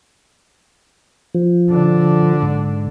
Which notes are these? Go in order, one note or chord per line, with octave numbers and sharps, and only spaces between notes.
F3
D3 D4
G#2